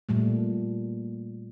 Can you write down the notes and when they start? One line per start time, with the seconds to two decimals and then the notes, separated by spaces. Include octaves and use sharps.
0.09 A#2 G3 A3